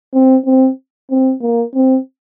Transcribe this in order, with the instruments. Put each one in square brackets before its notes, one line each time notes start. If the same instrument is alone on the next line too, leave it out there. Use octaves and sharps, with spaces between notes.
[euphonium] C4
C4
C4
A#3
C4